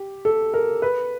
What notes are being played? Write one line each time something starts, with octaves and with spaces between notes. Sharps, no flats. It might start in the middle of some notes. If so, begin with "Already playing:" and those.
Already playing: G4
A4
A#4
B4